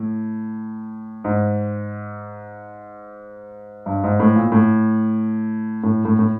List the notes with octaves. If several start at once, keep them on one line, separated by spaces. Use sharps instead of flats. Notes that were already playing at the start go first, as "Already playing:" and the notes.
Already playing: A2
G#2
G2
G#2
A2
A#2
A2
A2
A2
A2